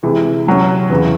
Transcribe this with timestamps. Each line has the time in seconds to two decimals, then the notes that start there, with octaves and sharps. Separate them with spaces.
0.03 C3 E3 G#3
0.47 C3 F#3 C#4
0.90 E2 C#3 E3